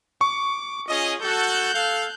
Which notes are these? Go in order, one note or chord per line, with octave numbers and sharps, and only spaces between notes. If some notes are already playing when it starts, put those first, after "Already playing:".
C#6 D6
C#4 F4 G#4 D#5
F#4 A4 F#6 G6
A4 F5